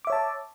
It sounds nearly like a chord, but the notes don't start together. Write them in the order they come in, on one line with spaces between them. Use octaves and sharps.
D6 E5 C#5 A5